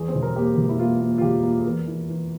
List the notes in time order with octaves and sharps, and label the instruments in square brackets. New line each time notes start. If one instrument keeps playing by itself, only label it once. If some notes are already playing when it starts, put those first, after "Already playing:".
Already playing: [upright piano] E2 G#4
C4
E1
A#4
A#3 G4
E1
E4
A#3 F4
A#3
F4
E1 G4
A#3
G#4
E2 A#4
E3
E3